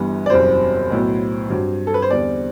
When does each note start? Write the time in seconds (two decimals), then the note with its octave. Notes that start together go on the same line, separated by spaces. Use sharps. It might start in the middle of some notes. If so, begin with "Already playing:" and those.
Already playing: G1 G2 E3 G3 B3
0.26 D5
0.30 F#1 E2 B2 G3 C4 C5
0.90 B1 A2 F#3 B3
1.50 G2 F#3 C4
1.87 A4
1.94 B4
2.02 C5
2.10 E2 D3 G3 C4 D5